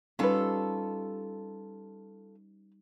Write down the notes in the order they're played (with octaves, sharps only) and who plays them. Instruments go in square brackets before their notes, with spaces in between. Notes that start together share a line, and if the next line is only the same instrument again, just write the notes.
[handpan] G3 D#4 [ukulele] C#4 B4 [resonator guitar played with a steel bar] F4 A4